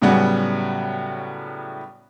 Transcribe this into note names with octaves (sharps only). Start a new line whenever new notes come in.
A2 C#3 F#3 G3 B3 F#4